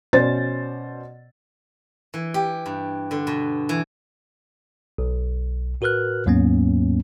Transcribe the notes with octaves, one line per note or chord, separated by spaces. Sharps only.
B2 C#4 C5 D5 A6
E3
G4
G2
D3
B2
E3
B1
A2 F#4 A#4 B4 F6 F#6
D#2 G#2 F#3 A#3 B3 C#4